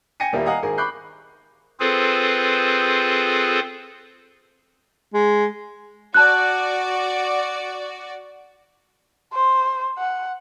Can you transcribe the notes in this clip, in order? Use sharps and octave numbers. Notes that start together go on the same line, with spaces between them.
G5 G#5 A#6 C#7 D#7
D#1 G3 A#3 E4 A#4
D#5 F5 F#5 G#5 A#5 D#6
G#1 G#4 A#4
B5 C#6 D6 F#6 G6 C7
C4 F4 G#4 A4 B4 C5
G#3
F#4 D5 A5 F#6
C5
F#5